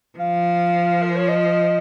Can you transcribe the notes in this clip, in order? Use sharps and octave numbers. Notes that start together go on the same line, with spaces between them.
F3 F5
A#4
C#5
D#5